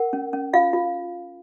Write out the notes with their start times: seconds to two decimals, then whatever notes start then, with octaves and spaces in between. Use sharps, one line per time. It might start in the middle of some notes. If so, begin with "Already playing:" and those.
Already playing: A#4 F#5
0.13 C#4
0.33 C#4
0.53 F4 F5
0.73 F4